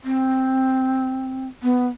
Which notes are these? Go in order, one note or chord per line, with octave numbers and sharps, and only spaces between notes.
C4
B3